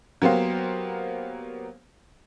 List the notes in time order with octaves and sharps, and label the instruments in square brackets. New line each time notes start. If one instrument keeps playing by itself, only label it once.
[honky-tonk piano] F#3 A#3 B3 G4 C5 F5